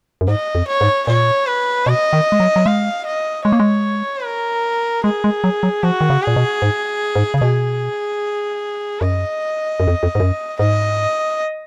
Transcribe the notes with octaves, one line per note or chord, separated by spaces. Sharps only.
F#2
G#2 D#5
F2
C#5
G#2
A#2 C#5
B4
B2 D#5
D#3
G#3
F#3
F#3
G#3 F5
D#5
G#3 C#5
A#3
G#3
A#4
G#3 G#4
G#3
F#3
F#3
F3 F#4
D#3
C#3
A#2 G#4
B2
G#2
G#2
C#3
B2 G#4
F#2 D#5
F#2
F2
F2
G#2
F#2
G#2 D#5